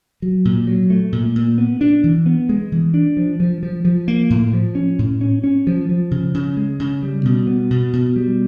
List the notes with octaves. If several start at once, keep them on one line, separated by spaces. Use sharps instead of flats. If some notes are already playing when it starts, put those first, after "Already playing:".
F#3
A#2
F#3
A3
A#2
A#2
B3
D4
E3
B3
G#3
E3
D4
F3
F3
F3
F3
A#3
A2
F3
C#4
A2
C#4
C#4
F3
F3
C#3
C#3
G#3
C#3
G3
B2
B3
B2
B2
G3